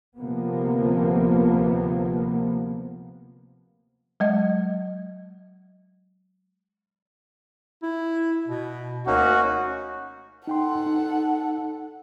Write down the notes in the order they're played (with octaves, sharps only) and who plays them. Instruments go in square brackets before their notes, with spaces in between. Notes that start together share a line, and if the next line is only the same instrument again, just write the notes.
[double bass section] D2 C3 F3 A#3 B3
[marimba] F#3 G#3 D#5
[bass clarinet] E4
B2
[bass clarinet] D2 [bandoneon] A#3 C#4 D#4 [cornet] F#4
[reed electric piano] D#4 G5 C6 [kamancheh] A4 F#5
[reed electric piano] D#4